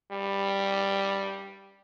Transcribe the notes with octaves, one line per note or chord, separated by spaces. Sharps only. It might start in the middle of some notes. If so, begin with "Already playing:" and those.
G3